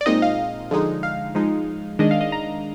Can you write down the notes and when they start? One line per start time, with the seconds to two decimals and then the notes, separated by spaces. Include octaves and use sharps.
0.01 D5
0.06 A#2 G#3 C4 D#4 D#5
0.22 F5
0.71 D3 F3 G#3 D#4
1.03 F5
1.35 F3 G#3 D#4
1.99 D#3 G#3 D4 D#5
2.11 F5
2.21 D#5
2.32 A#5